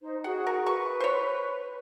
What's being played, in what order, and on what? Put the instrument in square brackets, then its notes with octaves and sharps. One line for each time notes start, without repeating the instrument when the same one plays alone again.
[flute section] D#4 C5
[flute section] F#4 G#4 [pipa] F#5
[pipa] A#4
[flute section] B4 [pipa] C#6
[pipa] C5 C#5